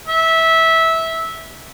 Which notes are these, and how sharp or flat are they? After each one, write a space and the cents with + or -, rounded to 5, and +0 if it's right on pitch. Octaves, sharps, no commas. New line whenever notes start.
E5 -15